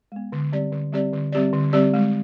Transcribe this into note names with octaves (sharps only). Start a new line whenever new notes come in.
G#3 B3
D3
G3 C4 G4 D5
D3
G3 C4 G4 D5
D3
G3 C4 G4 D5
D3
G3 C4 G4 D5
G#3